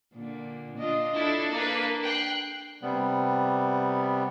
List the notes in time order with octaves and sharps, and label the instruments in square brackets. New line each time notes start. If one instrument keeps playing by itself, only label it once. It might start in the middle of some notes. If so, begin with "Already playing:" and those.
[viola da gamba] A#2 D3
D4 F4 D#5
[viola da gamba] D4 A4 [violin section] E4
[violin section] A#3 B4
G5 F#6 C7
[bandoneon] C3 G3 B3